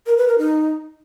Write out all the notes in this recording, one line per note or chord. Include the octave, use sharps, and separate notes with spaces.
A#4
B4
A#4
D#4